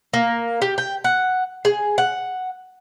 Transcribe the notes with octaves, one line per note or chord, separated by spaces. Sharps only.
A#3
G4
G5
F#5
G#4
F#5